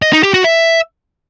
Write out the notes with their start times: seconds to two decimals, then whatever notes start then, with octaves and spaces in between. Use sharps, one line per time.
0.02 D#5
0.13 D#4
0.23 G4
0.34 F#4
0.44 E5